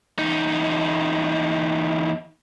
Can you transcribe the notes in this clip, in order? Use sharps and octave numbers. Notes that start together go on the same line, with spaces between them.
E2 D#4